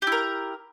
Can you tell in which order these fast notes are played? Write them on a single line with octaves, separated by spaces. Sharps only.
G4 E4 A#4